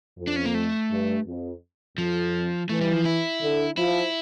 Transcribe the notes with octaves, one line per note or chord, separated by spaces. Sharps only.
F2
D4
C#4
A#3
A3
G2
F2
F2 F3
E3 A3
G3
F3
E4
D3
F3 E4